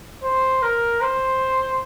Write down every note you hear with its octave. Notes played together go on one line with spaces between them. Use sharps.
C5
A#4
C5